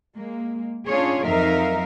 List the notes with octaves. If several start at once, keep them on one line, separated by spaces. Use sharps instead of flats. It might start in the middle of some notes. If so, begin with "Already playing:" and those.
G#3 A#3
C#4 D4 F4 G#4 C#5
F2 F#3 D#4 A#4 E5 F5